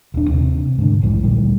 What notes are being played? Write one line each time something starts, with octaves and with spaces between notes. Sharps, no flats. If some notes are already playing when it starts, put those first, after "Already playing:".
D#1 D4
D#2 C3
C3
G#2 D3
A#1 F2 G#2 E3
D2 A#2 G3